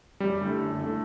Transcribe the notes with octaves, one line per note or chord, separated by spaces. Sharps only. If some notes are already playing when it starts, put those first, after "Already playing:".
F#2 G3
D3 A3 E4 A4
F#2
D3 A3 E4 A4